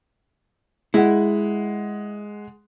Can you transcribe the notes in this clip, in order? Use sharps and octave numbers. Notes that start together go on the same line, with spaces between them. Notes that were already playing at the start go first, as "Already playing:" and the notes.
G#3 E4 F#5